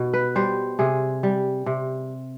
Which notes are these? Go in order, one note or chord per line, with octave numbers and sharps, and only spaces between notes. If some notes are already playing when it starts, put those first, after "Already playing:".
Already playing: B2
B4
G3 C5
C3 G#4
G3
C3